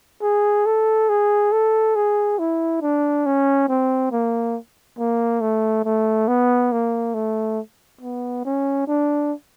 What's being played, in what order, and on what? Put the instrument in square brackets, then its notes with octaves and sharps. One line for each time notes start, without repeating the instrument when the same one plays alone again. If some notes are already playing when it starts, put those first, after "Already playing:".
[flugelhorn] G#4
A4
G#4
A4
G#4
E4
D4
C#4
C4
A#3
A#3
A3
A3
B3
A#3
A3
B3
C#4
D4